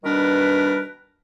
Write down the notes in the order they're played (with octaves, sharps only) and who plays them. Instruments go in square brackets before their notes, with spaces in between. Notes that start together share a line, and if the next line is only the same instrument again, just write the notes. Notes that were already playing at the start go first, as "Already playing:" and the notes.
[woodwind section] B2 D#3 G3 D4 A#4 B4